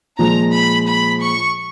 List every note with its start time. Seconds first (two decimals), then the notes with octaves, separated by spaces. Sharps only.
0.18 A#2 F3 G#3 A#5
0.53 B5
0.87 B5
1.22 C#6